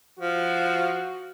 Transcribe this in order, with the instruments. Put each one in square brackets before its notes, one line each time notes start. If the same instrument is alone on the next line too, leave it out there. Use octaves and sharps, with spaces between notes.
[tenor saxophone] F3 [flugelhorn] F#4